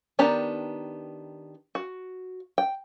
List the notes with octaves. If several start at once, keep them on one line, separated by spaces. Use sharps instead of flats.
D#3 B3 D4 G4 A#5
F#4
G5